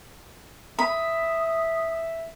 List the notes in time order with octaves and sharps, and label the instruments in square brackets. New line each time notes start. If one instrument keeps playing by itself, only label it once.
[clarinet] E5 [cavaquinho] B5 [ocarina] D#6